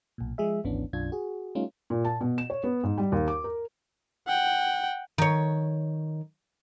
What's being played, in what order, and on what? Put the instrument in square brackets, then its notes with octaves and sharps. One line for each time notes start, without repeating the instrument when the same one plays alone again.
[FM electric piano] B1 A#2
F3 G#3 G#4 E5
G#1 D2 E3 B3 C#4 D4
B1 F#2 D4 F4 G#6
F#4 G#4
G3 A3 C#4 D#4 F4
[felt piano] A#2
A5
B2
E7
C#5
B3
G#2
G3
D#2
D6
A#4
[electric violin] F#5 G5
[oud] D#3 C#5